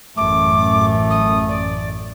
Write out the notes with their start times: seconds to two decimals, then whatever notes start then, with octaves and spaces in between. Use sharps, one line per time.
0.17 A1 F#2 A3 D6
1.10 D#6
1.49 D5